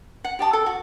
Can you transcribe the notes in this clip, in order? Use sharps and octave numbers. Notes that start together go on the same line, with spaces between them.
F#5
G4 D5 A5 D#6
A4
F#4